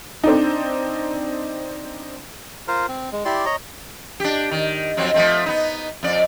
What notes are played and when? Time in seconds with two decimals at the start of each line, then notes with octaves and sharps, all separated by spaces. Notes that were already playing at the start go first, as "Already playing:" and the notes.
0.24 C4 D4 D#4
2.68 F4 A#4 C5
2.88 C4
3.12 G#3
3.25 E4 G4 D5 C6
3.46 C#5 D#5 A#5
4.20 D4 G4
4.51 D#3
4.97 F2 F#3 C4
5.14 F3 A3 C4
5.46 B3 D#4
6.03 F2 D5